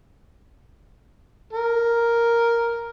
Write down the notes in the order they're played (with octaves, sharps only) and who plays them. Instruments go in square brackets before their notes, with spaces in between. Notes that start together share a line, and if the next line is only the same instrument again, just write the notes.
[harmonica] A#4